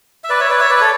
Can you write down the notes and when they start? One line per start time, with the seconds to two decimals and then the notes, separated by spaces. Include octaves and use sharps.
0.24 E5
0.30 B4 D5
0.40 C#5 E5
0.50 B4 D5
0.60 C#5 E5
0.70 B4 D5
0.80 A4 C#5